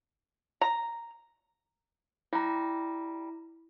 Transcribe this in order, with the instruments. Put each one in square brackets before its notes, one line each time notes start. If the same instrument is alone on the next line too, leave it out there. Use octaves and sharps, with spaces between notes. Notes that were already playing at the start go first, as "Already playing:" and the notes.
[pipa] A#5
[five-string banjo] G3 [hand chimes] E4 A#5